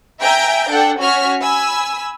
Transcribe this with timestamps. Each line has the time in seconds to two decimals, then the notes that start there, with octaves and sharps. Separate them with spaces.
0.21 E5 G5 G#5 A#5 G6 D7
0.69 D4 A4 F#5 G5
1.00 C#4 F#4 C#5 G#5 F6 B6
1.39 G#5 B5 E6